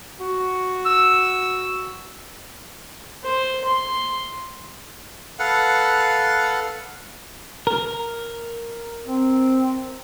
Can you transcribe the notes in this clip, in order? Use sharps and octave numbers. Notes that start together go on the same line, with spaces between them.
F#4
E6
C5
C6
A4 B4 F5 F#5
A#4
C4